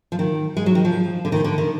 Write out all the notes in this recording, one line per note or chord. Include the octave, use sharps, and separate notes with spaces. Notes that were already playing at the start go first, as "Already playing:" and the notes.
F3
D#3
G#3
F#3
D#3
F3
D3
D#3
D3
D#3